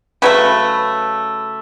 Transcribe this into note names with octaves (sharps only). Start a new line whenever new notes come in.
C#3 F#3 A3 B4